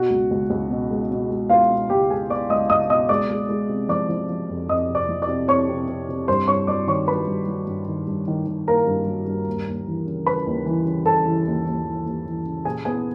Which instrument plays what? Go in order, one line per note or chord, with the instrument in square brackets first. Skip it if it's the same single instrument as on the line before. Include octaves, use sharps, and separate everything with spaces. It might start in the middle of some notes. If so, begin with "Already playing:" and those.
Already playing: [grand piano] B2 F#4 F#5
C#2
C#2
C#2
B2
G#3
B2
G#3
B3 F4 F5
B2
C#2 G4 G5
G#3 G#4 G#5
B3 D5 D6
C#2 D#5 D#6
C#2 D#5 D#6
B2 D#5 D#6
G#3 D5 D6
G#3
G#3
C3
F3 D5 D6
F3
F3
F2
F2 D#5 D#6
C3
D5 D6
F3
D5 D6
C3
F2 C#5 C#6
C3
C3
C3
G2 C5 C6
G2 C#5 C#6
F#3 D5 D6
D#3 C#5 C#6
F#3 B4 B5
G2
F#3
G2
D#3
G2
D#3
D#3
A#3 A#4 A#5
G2
F#3
G2
D#2
D#2
E3
C#3
C#3 B4 B5
D#2
E3
C#3
C#3 A4 A5
E3
D#2
D#2
E3
D#2
E3
C#3
A#2 G#4 G#5
B3 G#4 G#5